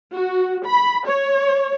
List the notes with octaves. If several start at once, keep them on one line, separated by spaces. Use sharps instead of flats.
F#4
B5
C#5